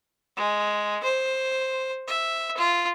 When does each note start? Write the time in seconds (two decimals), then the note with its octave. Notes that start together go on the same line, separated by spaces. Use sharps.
0.37 G#3
1.03 C5
2.07 E5
2.57 F4